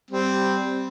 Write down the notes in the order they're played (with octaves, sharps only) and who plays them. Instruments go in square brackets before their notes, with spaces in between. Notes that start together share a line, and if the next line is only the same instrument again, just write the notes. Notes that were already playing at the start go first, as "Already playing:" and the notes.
[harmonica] G3 C4